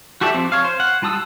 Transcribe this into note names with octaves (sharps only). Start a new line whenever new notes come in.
F#4 G4 A4 D5 E5
F3 C4
C#5 F5
C5
F#5
G3 F4 A5 D#6 E6